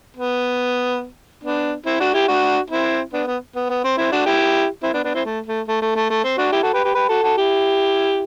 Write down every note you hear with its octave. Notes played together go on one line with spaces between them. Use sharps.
B3
B3 D4
C4 E4
D4 F#4
E4 G4
D4 F#4
C4 E4
B3 D4
B3
B3
B3
C4
C4 E4
D4 F#4
E4 G4
C4 E4
B3 D4
B3 D4
C4 E4
A3
A3
A3
A3
A3
A3
C4
D4 F#4
E4 G4
F#4 A4
G4 B4
G4 B4
G4 B4
F#4 A4
F#4 A4
E4 G4